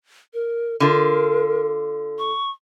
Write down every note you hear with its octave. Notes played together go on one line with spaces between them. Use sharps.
A#4
D3 F4 A#4
C#6